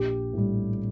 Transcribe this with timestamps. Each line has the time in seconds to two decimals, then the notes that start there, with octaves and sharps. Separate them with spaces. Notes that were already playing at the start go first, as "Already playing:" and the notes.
Already playing: A#1 G4
0.33 A2 G3